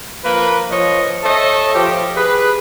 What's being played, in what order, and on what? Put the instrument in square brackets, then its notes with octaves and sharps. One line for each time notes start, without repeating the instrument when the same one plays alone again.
[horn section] F3 A#3 A#4 B4
F3 C#5 D#5
A4 C#5 D#5 E5 A5
F3 G4
G#4 B4